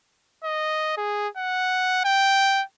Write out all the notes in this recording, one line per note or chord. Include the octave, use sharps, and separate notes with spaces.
D#5
G#4
F#5
G5